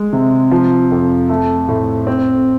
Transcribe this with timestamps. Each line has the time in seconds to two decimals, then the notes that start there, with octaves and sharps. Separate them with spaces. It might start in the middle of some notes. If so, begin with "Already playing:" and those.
Already playing: G#3
0.13 C3
0.51 F3
0.91 F2
1.29 A3
1.68 A2
2.07 C4